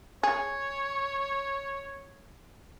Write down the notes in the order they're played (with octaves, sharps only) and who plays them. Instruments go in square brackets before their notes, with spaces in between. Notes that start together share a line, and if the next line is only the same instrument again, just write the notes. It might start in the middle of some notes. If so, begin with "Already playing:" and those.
[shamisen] G#4 [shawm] C#5